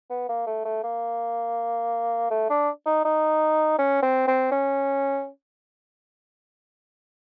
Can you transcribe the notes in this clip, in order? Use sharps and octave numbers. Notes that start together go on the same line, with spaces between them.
B3
A#3
A3
A3
A#3
A3
D4
D#4
D#4
C#4
C4
C4
C#4